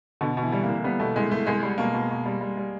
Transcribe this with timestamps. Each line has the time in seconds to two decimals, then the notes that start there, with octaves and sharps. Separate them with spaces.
0.21 B2 D3
0.37 B2
0.43 E3
0.52 G3
0.64 A#3
0.68 C2
0.84 G3 B3
0.99 B2 A3
1.16 C2 G#3
1.31 C2 A3
1.46 C2 G#3
1.63 G3
1.78 B2 A#3
1.94 B2
2.10 B2
2.25 G3
2.41 G3
2.57 G3